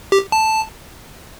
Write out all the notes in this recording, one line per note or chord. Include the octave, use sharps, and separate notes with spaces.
G4
A5